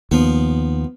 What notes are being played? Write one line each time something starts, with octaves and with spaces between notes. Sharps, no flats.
D#2 F3 B3